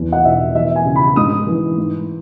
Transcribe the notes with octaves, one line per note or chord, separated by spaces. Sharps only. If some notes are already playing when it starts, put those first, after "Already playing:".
Already playing: E2
F#5
B2 E5
E3 E5
G#5
C#3
B5
G#2 D#6
E3
G#2